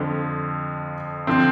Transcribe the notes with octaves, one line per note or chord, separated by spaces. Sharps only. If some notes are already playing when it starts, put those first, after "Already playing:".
Already playing: F2 D3 F3
D3 F3 C4